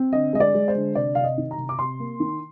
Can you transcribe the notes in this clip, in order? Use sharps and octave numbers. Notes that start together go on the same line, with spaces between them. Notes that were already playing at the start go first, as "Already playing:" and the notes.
Already playing: C4
D3 D#5
G#3 D#5
D5
G#3
C5
D3
C3 D5
C3 F5
D#5
D#3
A#5
C3
D6
C3 C6
A#3
D#3